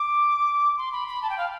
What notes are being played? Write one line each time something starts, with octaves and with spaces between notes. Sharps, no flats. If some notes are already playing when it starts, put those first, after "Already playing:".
Already playing: D6
C6
B5
B5
A5
G5
F5